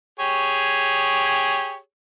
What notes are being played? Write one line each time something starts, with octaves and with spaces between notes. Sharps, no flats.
G4 G#4 C#5